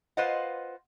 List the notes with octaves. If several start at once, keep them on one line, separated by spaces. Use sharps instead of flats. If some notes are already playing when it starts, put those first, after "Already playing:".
F4 B4 C5 D#5 F5 F#5